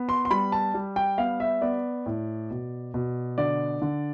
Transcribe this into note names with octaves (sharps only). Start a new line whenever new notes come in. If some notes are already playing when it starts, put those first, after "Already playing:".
Already playing: B3
C6
C6
G3 B5
A5
G3
G5
B3 F5
E5
B3 D5
A2
B2
B2
D3 D5
D3